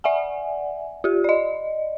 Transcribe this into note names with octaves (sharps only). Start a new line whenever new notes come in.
D5 E5 F#5 G#5
F4 G4
D5 D#5